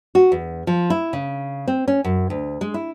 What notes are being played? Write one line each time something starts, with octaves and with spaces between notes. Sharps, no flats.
F#4
E2
F3
E4
C#3
C4
C#4
F#2
D2
G#3
E4